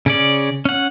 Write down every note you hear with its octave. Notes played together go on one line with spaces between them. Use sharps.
C#3 C#4 D5
C#4 F#5